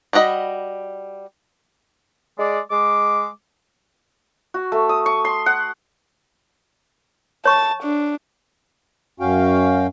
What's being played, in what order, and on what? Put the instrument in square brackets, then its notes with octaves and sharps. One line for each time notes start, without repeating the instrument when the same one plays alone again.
[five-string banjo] G3 D4 F#4 D#5 B5
[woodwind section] G#3 D5
G#3 D6
[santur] F#4
A3
D#6
C#6
C6
F#5
[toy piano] C#5 C#6 [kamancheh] A5
[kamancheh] D4
[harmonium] F#2 C#4 F#4 F5 G5